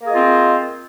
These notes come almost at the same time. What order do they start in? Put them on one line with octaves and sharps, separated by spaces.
A#3 G#4 D#5 F4 C4